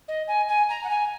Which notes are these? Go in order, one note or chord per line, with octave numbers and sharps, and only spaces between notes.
D#5
G#5
G#5
A#5
F#5
G#5